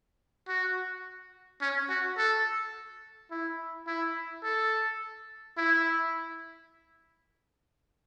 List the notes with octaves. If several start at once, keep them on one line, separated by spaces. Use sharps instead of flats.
F#4
C#4
F#4
A4
E4
E4
A4
E4